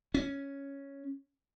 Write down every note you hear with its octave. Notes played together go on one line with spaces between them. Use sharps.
C#4